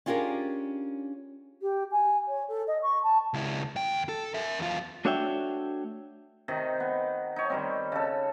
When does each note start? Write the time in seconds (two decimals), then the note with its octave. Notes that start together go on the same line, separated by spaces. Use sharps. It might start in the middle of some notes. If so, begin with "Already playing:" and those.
0.06 C#4 D4 F4 G4 G#4 A#4
1.61 G4
1.91 G#5
2.28 C#5
2.48 A4
2.67 D#5
2.82 C#6
3.03 A5
3.34 C#2 E4
3.76 D#2 G5
4.09 A4
4.34 A#4 E5
4.59 E2 F4
5.05 A3 D4 F#4 C#5 E5 G5
6.48 C3 D#3 D#4
6.80 B3
7.36 D#4 C#5
7.50 D#3 G3 C4
7.92 C#3 A4